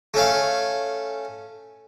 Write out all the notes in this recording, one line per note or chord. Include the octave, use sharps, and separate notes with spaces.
A3 C#4 F5